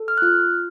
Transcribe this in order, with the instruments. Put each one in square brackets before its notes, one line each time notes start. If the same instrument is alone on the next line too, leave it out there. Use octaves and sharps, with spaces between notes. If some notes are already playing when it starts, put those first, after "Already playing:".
Already playing: [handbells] A4
F6
F#6
F4 F6